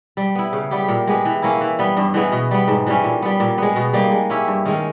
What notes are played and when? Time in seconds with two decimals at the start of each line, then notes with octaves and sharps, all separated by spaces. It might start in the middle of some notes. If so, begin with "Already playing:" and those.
0.17 G3
0.35 B3 E4
0.53 C#3
0.71 G3 B3 G4
0.88 A#2
1.07 G#3 B3 G4
1.25 E3
1.42 A#3 C#4 E4
1.61 E3
1.79 G3 B3
1.97 G2
2.14 E3 G#3 B3
2.32 B2
2.51 G3 B3
2.68 G#2
2.86 E3 G3 C#4
3.04 A#2
3.22 G3 B3
3.40 A#2
3.58 G#3 B3
3.76 B2
3.93 G3 A#3 D#4
4.11 G#3
4.30 C#4 E4 G4
4.48 G2
4.65 D#3 G#3 C#4